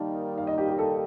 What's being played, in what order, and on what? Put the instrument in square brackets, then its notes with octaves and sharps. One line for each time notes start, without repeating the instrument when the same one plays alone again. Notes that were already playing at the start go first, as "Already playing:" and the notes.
Already playing: [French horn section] D#3 G3 A#3 D#4 [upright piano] A5
[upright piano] F5
D#5
G4
G4
A4